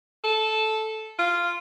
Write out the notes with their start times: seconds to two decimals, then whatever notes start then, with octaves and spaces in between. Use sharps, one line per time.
0.24 A4
1.19 F4